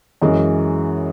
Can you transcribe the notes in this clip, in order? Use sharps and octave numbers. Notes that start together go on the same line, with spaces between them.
F#2 E3 G#3 C#4